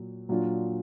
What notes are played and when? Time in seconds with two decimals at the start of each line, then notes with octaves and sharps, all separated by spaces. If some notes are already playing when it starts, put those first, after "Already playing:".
Already playing: A#2 F#3
0.29 A#2 F#3 D4 F4